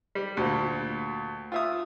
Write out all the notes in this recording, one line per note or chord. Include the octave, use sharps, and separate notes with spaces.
G3
D2 A#2
F4 E5 D#6